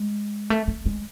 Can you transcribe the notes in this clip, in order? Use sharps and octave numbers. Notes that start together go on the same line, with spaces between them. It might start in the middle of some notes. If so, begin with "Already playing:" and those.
Already playing: G#3
A3
A3
G#3